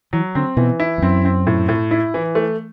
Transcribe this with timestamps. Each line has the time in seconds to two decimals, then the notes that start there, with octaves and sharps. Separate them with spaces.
0.13 E3 F#3
0.35 D3 C4
0.57 B2 E3
0.80 E4
0.98 E2
1.02 F#2 C4
1.25 C4
1.47 A2
1.69 A2
1.91 E4
2.14 E3
2.35 A3